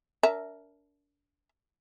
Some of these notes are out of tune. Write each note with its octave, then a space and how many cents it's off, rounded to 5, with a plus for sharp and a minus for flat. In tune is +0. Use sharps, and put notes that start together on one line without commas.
D4 -35 A#4 -5 E5 -10